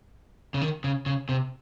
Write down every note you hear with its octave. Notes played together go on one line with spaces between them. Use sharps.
C#3
D#3
C#3
C#3
C3